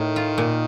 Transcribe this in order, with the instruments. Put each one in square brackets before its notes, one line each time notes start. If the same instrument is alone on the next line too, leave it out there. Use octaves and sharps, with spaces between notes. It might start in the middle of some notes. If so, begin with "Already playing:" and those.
Already playing: [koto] A2 [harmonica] D#3
[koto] F4
A#2